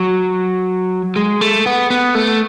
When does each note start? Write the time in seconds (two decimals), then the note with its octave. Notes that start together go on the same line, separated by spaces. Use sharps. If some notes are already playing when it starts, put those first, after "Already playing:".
Already playing: F#3
1.16 G#3
1.41 A3
1.66 B3
1.90 B3
2.15 A3